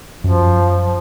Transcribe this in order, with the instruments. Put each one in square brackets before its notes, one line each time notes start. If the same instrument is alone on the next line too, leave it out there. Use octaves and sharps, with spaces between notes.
[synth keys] F#2 [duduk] F3